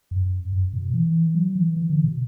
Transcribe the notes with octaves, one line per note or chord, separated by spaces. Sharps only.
F#2
F#2
B2
E3
F#3
E3
E3
D3
B2